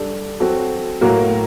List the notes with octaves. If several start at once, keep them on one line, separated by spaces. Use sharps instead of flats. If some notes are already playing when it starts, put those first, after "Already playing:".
Already playing: G3 D4 A4
F#3 C4 F#4 A4
A2 F#3 A#3 F#4 A#4